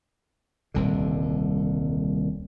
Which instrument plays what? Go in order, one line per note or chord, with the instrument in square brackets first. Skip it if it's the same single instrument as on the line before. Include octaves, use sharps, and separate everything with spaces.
[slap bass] D#1 C2 D3